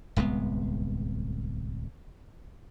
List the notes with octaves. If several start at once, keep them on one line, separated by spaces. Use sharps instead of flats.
D1 C2 G#3 B3